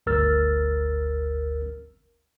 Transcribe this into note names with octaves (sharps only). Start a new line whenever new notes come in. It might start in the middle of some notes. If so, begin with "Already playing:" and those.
G1 D2 A#4 E6 F6 A6